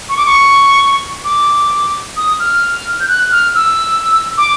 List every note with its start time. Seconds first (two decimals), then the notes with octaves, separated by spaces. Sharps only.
0.09 C#6
0.17 D6
0.26 C#6
1.24 D6
2.17 D#6
2.40 F6
3.00 G6
3.08 F#6
3.32 F6
3.55 E6
4.38 D6